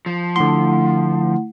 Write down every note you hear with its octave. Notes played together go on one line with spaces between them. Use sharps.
F3
D3 A3 E4 F#5 C6